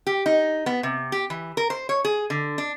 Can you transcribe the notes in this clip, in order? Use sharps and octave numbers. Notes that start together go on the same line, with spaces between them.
G4
D#4
B3
C3
G4
E3
A#4
C5
C#5
G#4
D3
D4